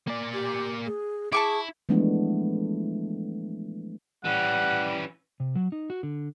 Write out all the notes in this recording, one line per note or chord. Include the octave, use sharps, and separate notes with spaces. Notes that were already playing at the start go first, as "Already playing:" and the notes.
A#3 D5
G4
G#4
E4 G#4 A5 C#6 D6
E3 F3 G#3 A3 B3 D4
E3 G3 C#4 F#5
C3
F#3
D#4
F#4
D3